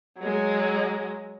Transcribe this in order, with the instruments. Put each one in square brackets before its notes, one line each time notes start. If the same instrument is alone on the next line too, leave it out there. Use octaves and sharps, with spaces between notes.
[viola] F#3 G#3